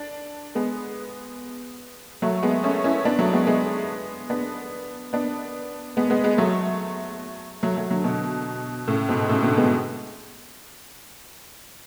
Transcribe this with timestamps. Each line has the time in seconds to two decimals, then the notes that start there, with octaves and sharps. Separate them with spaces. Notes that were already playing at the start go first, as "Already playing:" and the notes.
Already playing: D4
0.55 G#3 B3
2.22 F#3 A3
2.43 G#3 B3
2.64 A3 C#4
2.84 C#4 E4
3.05 B3 D4
3.19 F#3 A3
3.33 G#3 B3
3.47 G#3 B3
4.30 B3 D4
5.13 B3 D4
5.97 G#3 B3
6.10 G#3 B3
6.24 G#3 B3
6.38 F#3 A3
7.63 F#3 A3
7.76 F#3 A3
7.91 D3 F#3
8.04 B2 D3
8.88 A2 C#3
9.09 G#2 B2
9.29 A2 C#3
9.43 B2 D3
9.57 G#3 B3